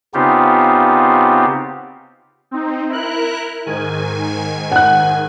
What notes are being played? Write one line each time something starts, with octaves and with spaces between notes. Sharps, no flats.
C#3 B3 C4 D#4 F4 G4
C4 D#4
E4 A#4 F#6
G#2 D#3 G#5
F#5 F#6